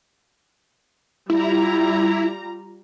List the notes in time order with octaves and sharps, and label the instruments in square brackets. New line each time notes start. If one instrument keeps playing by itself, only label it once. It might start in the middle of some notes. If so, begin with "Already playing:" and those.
[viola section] G3 F4 A#5 [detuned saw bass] E4